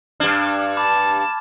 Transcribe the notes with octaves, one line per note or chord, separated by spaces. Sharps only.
G2 D4 F6 G#6 E7
A5 B5 D6 E7